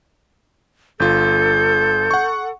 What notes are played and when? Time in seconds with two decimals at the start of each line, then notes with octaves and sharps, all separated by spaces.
1.00 G1 F4 A4 G6
2.11 F#5 C#6